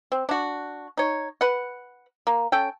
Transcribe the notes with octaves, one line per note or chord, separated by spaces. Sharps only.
C4
D4 F#4
D#4 C#5
B4 F#5
A#3
C#4 A4 G5